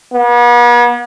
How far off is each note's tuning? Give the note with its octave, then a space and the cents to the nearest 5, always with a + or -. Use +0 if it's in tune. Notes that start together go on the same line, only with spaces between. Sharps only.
B3 -45